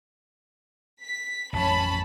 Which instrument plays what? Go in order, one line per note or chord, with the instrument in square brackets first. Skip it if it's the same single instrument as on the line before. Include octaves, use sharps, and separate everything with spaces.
[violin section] B6
[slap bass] A1 F2 F#3 [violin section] C#4 A5 B5